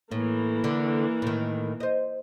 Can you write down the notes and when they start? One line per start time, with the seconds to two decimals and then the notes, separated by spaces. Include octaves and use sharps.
0.11 A2 E3 A#3
0.64 D3
1.22 A2 D#3
1.80 C5 D#5